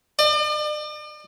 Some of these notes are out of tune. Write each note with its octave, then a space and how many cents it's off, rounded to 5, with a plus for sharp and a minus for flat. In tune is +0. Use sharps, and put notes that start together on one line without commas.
D5 +45